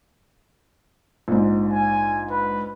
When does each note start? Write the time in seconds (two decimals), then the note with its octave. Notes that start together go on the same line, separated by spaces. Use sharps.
1.28 A#1 G#2
1.73 G#5
2.31 B4